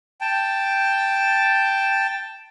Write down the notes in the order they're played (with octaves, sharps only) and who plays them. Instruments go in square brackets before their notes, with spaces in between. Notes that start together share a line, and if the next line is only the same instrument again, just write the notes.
[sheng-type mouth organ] G5 A5